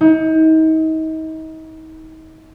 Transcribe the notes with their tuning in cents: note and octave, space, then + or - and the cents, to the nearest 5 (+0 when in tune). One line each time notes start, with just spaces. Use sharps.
D#4 +35